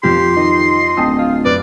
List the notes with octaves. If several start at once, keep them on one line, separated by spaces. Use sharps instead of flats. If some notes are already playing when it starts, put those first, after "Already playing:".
F2 F3 G4 C6
D#3 D#5
D1 G5 A5 D#6
F4
F#2 B4 D5